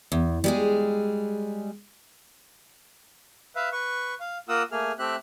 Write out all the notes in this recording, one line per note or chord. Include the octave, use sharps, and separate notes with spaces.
E2
G3 G#3 G#4
B4 E5 F5
B4 C#6
F5
A#3 F4 A#4 F#5 D#6 E6
A3 A#3 G#4 F6
A3 C4 G4 E5 F#6